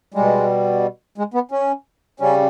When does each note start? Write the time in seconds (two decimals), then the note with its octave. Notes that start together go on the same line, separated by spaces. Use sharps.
0.14 B2 G3 G#3
1.18 G#3
1.34 B3
1.51 C#4
2.20 C#3 G3 C#4